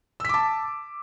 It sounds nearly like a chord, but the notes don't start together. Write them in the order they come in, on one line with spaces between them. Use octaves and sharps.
E6 B6 D6 A5